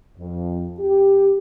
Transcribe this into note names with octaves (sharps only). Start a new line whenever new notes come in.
F2
G4